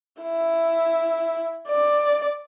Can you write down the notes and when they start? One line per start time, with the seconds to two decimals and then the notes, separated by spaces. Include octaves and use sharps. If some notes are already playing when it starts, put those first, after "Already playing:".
0.22 E4
1.68 D5